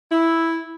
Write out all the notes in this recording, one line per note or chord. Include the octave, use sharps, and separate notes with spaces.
E4